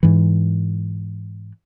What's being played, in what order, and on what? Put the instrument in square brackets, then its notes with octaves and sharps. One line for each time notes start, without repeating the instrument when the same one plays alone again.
[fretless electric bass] G#2 E3